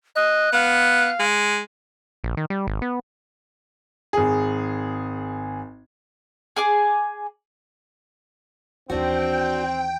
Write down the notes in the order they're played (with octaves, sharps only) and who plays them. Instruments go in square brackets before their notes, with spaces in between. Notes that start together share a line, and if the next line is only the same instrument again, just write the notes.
[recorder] D#5 [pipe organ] F#6
[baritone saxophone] B3 [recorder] F5
[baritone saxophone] G#3
[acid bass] A#1
D#3
G3
G#1
B3
[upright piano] G#1 G#4
[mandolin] G#4 G#5 D6
[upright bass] D#2 E3 [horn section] C4 [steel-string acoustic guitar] D4 F#4 [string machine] G5